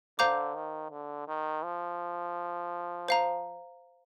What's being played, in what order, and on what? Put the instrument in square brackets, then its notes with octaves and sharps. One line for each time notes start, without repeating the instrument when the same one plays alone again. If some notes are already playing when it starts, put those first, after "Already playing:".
[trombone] D3 [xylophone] C5 F5 A#5 D6 G6
[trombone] D#3
D3
D#3
F3
[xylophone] C5 F5 A#5